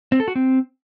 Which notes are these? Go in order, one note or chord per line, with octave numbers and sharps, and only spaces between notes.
C4
A4
F#4
C4